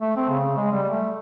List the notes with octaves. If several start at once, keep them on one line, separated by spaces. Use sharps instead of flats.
A3
C4
C#3
G#3
G3
A3